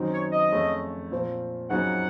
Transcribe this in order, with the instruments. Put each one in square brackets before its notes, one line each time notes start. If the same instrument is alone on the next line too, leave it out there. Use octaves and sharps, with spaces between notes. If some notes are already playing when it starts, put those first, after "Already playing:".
Already playing: [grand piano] F#2 D#3 F#3 C4 D#4
[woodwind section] C#5
D#5
[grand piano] F2 C#3 A3 C#4
A#2 F3 C4
[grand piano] F#2 C#3 F3 C4 D#4 [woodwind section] F#5